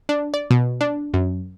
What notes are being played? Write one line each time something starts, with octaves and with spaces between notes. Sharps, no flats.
D4
D5
B2
D4
F#2